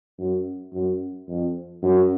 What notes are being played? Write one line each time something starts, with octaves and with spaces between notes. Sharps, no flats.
F#2
F#2
F2
F#2